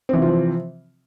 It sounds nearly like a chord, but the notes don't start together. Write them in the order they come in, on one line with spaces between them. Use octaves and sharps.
C4 E3 C3 F4 F3